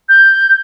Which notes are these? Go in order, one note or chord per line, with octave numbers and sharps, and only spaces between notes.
G6